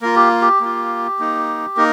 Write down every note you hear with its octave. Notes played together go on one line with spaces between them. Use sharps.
A#3 F4 A#4
G4
G4
A#3 F4
A#3 D#4
A#3 D#4 A#4